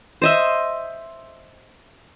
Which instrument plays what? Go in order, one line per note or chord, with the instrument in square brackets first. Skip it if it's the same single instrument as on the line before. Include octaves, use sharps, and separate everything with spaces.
[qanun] C5 D#5 E5